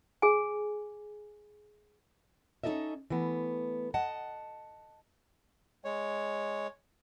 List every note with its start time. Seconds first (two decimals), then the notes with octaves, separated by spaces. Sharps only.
0.22 G#4 G#5
2.64 C#4 D#4 G4 A4 D#5 E5
3.10 E3 A3 B3
3.94 D#5 F#5 A5
5.85 G#3 C#5